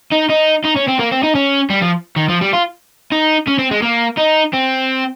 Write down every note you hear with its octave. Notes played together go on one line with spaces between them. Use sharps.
D#4
D#4
D#4
C#4
C4
A#3
C4
D#4
C#4
G3
F3
D#3
F3
G3
F4
D#4
C#4
C4
G#3
A#3
D#4
C4